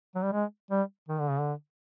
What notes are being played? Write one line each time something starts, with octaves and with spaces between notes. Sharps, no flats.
F#3
G3
G#3
G3
D#3
D3
C#3
D3